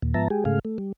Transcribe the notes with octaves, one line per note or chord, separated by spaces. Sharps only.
D#2 A#2
G#2 F3 B3 E5 A5 A#5
G#3 G4 G#4
G#2 C#3 A3 G#4 F5
A3
G3